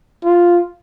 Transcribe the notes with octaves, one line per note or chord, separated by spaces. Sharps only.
F4